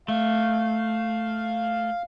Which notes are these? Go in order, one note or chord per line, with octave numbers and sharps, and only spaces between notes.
A3 F5